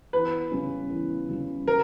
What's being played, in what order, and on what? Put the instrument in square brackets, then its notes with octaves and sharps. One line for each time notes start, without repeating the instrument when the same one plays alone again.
[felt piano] E2 [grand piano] B4
[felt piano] C#3 G3 C#4
E2
C#3 G3 C#4
[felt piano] C#3 [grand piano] A#4